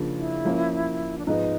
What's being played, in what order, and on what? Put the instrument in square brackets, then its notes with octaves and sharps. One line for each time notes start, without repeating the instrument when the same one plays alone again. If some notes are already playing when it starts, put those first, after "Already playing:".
Already playing: [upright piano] C#3 F3 A#3 D4 F4
[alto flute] E4
[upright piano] F3 A#3 C#4
[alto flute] D4
[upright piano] G#2 F3 G#3 B3 [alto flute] D#4